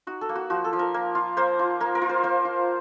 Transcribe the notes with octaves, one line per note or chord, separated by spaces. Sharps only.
D#4 F#4
A4
A#3
F#4
F3 F#4
A4
F3
A#4
A#3
F4
A#3 C5
F4
A#3 A#4
A#4
F4
C5
A#3 C5
F4